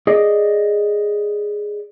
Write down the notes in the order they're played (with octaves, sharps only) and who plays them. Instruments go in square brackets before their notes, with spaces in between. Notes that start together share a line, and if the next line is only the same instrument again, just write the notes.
[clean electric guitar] G#4 D5 D#5